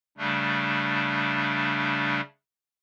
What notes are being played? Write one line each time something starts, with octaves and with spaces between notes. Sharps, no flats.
C#3 G3 A3 D4